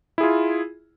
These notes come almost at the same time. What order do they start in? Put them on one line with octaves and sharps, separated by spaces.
E4 G#4 F4